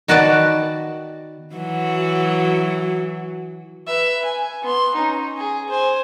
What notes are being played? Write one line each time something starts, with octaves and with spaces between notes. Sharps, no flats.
D#3 B3 F#4 B4 D5 A5
E3 F#3 F#4
B4 E5
G#5
B3 C6
C#4 D#4
G#4
C5 G#5